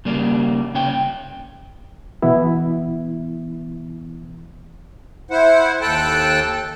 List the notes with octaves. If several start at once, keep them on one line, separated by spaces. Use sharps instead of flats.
C#3 G3 A#3 D4
C#3 C#5 G5
B2 E3 B3 E4
E4 C5 F#5
D#2 A4 G5 A5 F#6